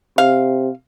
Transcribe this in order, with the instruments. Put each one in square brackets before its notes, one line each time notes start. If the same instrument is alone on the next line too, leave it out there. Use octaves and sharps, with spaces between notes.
[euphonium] C3 [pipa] F5